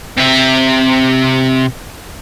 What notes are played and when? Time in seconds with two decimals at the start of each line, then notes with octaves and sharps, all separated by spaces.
0.18 C3 E5